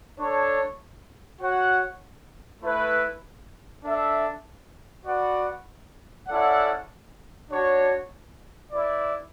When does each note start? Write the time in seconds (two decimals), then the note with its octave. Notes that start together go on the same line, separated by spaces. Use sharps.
0.17 D4 A4 C#5
1.39 F#4 C#5 F#5
2.62 A3 E4 B4
3.84 D4 A4 E5
5.06 F#4 B4 D5 F#5
6.28 C#4 E4 A4 D5 F#5
7.50 D4 F#4 C#5
8.72 E4 B4 D5